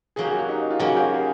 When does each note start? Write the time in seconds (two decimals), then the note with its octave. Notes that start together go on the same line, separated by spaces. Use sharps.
0.16 C#3 F#3 A#3 G#4
0.25 G4
0.31 F#4
0.39 G4
0.49 D#4
0.70 F4
0.79 C#3 F#3 A#3 F#4
0.97 G4
1.00 F#4
1.14 G#4